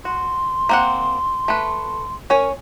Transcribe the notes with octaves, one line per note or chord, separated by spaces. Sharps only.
F#4 C6
A#3 C4 F#5
A3 B4
C#4 A#4 C#5 G#5